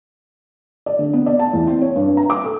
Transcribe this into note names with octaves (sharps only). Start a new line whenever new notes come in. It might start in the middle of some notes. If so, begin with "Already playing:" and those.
D5
D3
B3
D5
A5
E2
C4
C#5
G2
A#5
D6
A4